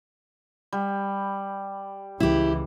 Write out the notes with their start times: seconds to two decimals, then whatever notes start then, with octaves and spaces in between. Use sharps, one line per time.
0.72 G3
2.20 C#2 E3 E4 G4